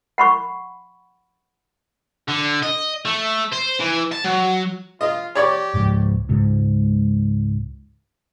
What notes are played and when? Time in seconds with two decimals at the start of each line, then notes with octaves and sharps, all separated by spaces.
0.18 F#5 B5 C#6
2.28 D3
2.63 D#5
3.05 A3
3.53 C5
3.80 E3
4.12 A5
4.24 F#3
5.01 F4 D#5
5.35 G4 C#5 D5 C#6
5.74 C#2 G#2
6.29 C#2 G#2